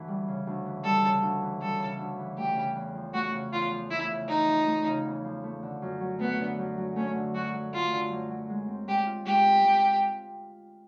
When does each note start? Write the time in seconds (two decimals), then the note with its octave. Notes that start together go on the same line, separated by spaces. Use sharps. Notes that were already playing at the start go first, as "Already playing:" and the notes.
Already playing: D2 E3
0.08 G3
0.28 C#3
0.47 D2
0.66 E3
0.84 G3 A4
1.04 C#3
1.22 D2
1.42 E3
1.61 G3 A4
1.80 C#3
1.99 D2
2.19 E3
2.37 A3 G4
2.56 C#3
2.75 E2
2.95 F3
3.14 A3 F#4
3.33 C#3
3.52 E2 F4
3.72 F3
3.90 A3 E4
4.10 C#3
4.28 E2 D#4
4.48 F3
4.67 A3
4.87 C#3
5.05 E2
5.25 F3
5.43 A3
5.63 D3
5.82 F#2
6.00 F#3
6.20 A3 B3
6.39 D3
6.59 F#2
6.77 F#3
6.96 A3 C#4
7.15 D3
7.34 F#2 F#4
7.53 F#3
7.73 A3 F4
7.93 D3
8.11 F#2
8.30 F#3
8.50 G#3
8.68 C4
8.88 G#3 G4
9.06 F4
9.26 G#3 G4
9.46 C4
9.64 G#3
9.84 F4